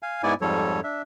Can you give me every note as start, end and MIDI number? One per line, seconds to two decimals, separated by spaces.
0.03 0.22 77
0.03 0.22 80
0.23 0.34 44
0.23 0.34 59
0.23 0.34 64
0.23 0.34 74
0.23 0.34 80
0.41 0.81 41
0.41 0.81 44
0.41 0.81 53
0.41 0.81 55
0.41 0.81 69
0.41 0.81 73
0.84 1.02 62
0.84 1.02 76